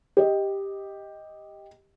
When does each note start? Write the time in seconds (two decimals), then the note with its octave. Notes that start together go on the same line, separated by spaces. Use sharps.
0.17 G4 D#5